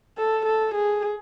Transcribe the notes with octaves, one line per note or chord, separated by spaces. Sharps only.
A4
A4
G#4